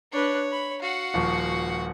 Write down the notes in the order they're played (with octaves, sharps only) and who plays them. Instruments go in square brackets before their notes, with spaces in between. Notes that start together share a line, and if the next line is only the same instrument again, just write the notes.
[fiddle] D4 B4 [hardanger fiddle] C#5
[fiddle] B5
[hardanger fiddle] F#4 F#5 [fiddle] F5
[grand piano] D#1 F3 C#6